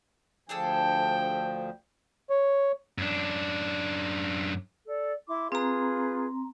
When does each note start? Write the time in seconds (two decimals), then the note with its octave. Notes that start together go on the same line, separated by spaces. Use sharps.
0.49 D2 F3 D4 G#4 A4 G5
2.30 C#5
2.98 F#2 D4
4.87 A4 D5
5.28 E4 C6 D6
5.52 C4 F4 G#4 B4 A#5